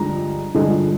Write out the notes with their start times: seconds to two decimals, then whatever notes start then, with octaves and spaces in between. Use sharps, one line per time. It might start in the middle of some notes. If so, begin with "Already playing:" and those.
Already playing: G2 D3 F3 G#3 A#5
0.54 G2 D3 F3 G#3